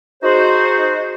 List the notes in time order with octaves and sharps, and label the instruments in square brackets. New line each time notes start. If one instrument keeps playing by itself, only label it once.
[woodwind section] D#4 F#4 G#4 C5